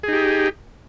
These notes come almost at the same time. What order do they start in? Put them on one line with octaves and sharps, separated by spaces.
G#4 D#4 G4